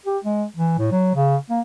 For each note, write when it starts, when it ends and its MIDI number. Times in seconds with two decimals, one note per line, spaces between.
0.06 0.18 67
0.24 0.45 56
0.57 0.74 52
0.78 0.90 45
0.91 1.14 54
1.15 1.37 49
1.50 1.60 58